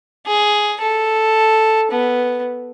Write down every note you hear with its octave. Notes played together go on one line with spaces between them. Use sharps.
G#4
A4
B3